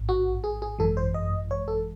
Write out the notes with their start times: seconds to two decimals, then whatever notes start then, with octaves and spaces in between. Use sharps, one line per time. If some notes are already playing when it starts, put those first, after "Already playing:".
Already playing: A1 G#2
0.09 F#4
0.44 G#4
0.62 G#4
0.79 G#1 F#2 E3 G#3 A4
0.97 C5
1.14 D#5
1.51 C#5
1.68 A4